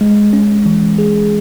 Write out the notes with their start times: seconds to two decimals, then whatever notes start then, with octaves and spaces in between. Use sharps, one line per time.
0.01 G#3
0.33 C#4
0.66 E3
0.98 G#4